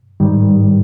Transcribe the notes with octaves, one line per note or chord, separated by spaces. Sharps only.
G#2 D#3 G3